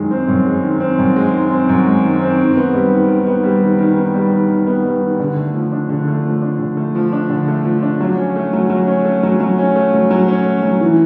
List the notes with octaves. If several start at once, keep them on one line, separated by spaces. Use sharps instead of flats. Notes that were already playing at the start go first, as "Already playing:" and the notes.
Already playing: F#2 D#3 G#3
C4
F#2
G#3
D#3
C4
F#2
G#3
D#3
C4
F#2
G#3
D#3
C4
D#3
B3
G3
D#3
D#3
B3
G3
D#3
D#3
B3
G3
D#3
D#3
B3
G3
D#3
D3
A3
F3
D4
D3
A3
F3
D4
D3
A3
F3
D4
D3
A3
F3
D4
F#3
C#4
A3
F#3
F#3
C#4
A3
F#3
F#3
C#4
A3
F#3
F#3
C#4
A3
F#3
E3